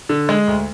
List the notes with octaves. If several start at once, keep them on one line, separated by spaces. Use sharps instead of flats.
D3
G#3
D2